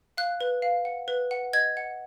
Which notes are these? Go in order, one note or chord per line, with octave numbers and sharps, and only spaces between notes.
F5 F#6
B4
F5
F#5
B4
F#5
D#5 G#6
F#5